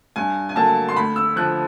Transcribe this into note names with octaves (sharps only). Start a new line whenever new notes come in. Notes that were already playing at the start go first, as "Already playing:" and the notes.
G2 G#5
G#5
D3 F#3 A#3 A5
C6
D2 B5
E6
D3 F3 F#6